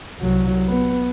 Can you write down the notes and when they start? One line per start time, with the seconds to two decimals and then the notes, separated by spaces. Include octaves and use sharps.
0.20 C2 F#3
0.68 B3